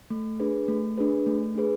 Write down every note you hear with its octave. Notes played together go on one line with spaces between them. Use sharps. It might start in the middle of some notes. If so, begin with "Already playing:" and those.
A3
D4 G#4 B4
A3
D4 G#4 B4
A3
D4 G#4 B4